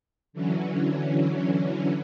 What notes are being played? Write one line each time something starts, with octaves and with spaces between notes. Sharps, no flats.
D3 E3 F#3 C#4